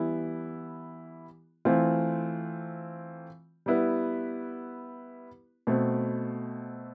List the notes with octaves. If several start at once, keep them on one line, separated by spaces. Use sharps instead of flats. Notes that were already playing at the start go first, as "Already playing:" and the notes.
Already playing: E3 G3 B3 E4
E3 A3 C4 F4
G3 B3 E4 B4
B2 A3 C4